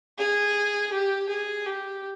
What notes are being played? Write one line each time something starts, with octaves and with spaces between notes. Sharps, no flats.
G#4
G4
G#4
G4